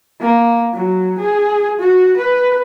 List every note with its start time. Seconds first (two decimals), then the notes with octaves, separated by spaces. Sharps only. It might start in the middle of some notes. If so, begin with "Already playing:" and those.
0.21 A#3
0.73 F#3
1.19 G#4
1.79 F#4
2.17 B4